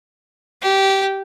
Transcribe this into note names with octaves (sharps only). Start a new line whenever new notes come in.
G4